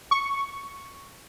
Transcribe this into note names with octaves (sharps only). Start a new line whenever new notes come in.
C#6